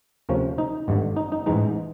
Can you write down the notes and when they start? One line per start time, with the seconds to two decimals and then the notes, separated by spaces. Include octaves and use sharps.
0.29 D2 C3 F3 A#3 C#4
0.58 D#4
0.88 G#1 G2 D3
1.16 D#4
1.32 D#4
1.46 A1 G#2 E3 G#3 D#4